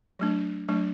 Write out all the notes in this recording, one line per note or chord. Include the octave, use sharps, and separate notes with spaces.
F#3 A3 D4
F#3 A3 D4